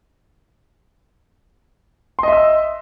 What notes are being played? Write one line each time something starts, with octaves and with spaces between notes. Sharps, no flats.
D#5 E5 C6 E6